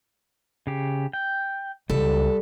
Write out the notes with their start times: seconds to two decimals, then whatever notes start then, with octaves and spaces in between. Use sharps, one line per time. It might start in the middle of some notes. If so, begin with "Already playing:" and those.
0.67 C#3 G4
1.13 G5
1.90 C#2 G3 A4